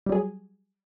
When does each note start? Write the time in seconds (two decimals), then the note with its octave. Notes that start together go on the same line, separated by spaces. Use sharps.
0.06 G3
0.09 F#3
0.12 G#4